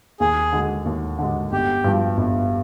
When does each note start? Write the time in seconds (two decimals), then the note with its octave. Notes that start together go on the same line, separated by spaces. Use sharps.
0.20 D#2 G#4
0.53 D3 G#3
0.86 D#2
1.18 D3 G#3
1.52 G1 G4
1.84 G2 F3
2.17 G1